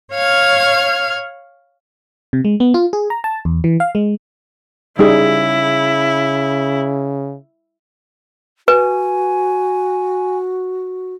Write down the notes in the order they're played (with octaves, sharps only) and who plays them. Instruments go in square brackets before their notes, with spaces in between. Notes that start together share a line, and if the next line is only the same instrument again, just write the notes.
[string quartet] C#5 F5 F6 G#6
[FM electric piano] C3
G#3
B3
F4
G#4
A#5
A5
E2
E3
F5
G#3
[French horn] C#3 [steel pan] G3 D#4 G#4 [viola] E4
[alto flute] F#4 [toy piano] B4 [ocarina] G#5